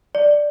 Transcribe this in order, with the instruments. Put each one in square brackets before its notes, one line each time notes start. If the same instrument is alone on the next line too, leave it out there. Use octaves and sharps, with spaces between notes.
[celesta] D5